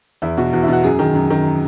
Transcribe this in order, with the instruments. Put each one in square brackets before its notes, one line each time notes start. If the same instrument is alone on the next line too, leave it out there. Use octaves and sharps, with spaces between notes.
[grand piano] E2 E4
B2 F#4
E2 F#4
E4
B2 F#4
F#2 G#4
D#3
F#2
D#3